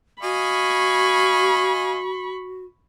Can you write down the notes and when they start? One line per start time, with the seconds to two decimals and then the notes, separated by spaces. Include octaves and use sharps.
0.23 F#4 D#5 F5 G#5 B5 C#6